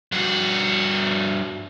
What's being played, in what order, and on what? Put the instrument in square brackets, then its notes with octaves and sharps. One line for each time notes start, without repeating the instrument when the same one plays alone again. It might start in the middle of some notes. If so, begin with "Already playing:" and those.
[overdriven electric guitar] G2 F#4